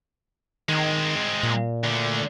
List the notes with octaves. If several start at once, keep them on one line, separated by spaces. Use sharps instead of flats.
D#3 G#3 C4
A#2
D2 D3